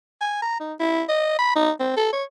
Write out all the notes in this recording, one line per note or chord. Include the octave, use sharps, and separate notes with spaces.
G#5
A#5
D#4
E4
D#5
B5
D#4
C4
A4
C#5